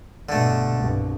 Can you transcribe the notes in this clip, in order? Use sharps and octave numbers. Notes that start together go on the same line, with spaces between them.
G2 B2 D3 A3
C2 G2